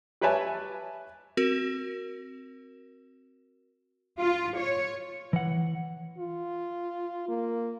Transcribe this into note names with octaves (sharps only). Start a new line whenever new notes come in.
G4 B4 C#5 E5 G#5 A5
C4 F#4 A#4
F4
C#5
E3 F#5
F4
A#3